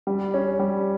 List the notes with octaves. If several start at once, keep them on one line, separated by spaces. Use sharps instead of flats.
G3
C#4
G3